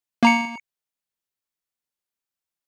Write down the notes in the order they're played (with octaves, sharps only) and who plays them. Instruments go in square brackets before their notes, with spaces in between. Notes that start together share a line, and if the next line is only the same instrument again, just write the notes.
[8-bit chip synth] A#3 A#5 C#7